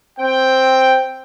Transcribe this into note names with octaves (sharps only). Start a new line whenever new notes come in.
C4 G5